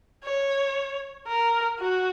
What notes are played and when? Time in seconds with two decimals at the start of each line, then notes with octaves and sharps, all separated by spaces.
0.24 C#5
1.27 A#4
1.79 F#4